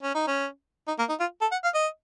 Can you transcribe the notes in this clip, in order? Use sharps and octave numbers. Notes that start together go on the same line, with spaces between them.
C#4
D#4
C#4
D#4
A#3
D#4
F4
A4
F#5
F5
D#5